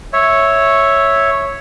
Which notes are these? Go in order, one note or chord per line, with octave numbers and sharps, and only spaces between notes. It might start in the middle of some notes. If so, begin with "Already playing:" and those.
C#5 E5